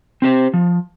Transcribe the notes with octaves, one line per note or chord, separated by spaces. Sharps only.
C4 G4 C5
F3